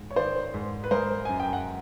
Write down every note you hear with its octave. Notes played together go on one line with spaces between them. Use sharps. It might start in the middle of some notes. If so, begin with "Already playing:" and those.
Already playing: G#2
C#5
D#3 C5 D5
G#2
B4
G#3 A#4 C5
F#2 G#5
G5
F#5